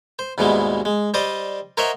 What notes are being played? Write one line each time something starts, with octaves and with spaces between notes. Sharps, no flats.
C5
D#2 G#2 B2 E3 G3 G#3
G#3
G3 C5 D5 D#5 D#6
A#4 C5 C#5 D#5 E5 F#5